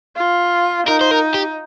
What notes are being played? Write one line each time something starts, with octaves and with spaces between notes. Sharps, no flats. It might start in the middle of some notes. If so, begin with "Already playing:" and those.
F4
D#4 A#4
C5
A#4
G4